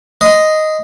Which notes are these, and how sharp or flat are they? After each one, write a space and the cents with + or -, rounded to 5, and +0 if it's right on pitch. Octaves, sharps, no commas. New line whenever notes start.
D#5 +0 C6 -30